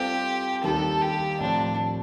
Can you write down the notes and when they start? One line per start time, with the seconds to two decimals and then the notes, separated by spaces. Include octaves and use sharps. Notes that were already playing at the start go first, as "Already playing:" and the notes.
Already playing: G3 C4 F4 G4 A4 C5
0.64 D#2 D#3 G3 D4 A4
1.02 G4
1.40 A2 F3 C4 D4